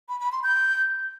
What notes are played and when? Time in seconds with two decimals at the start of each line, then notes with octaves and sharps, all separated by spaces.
0.09 B5
0.20 B5
0.32 C6
0.44 G6